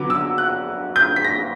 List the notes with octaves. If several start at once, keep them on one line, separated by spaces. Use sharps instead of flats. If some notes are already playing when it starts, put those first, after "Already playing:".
Already playing: D3 F#3 B3 D6
E6
F#6
G6
B6
A#6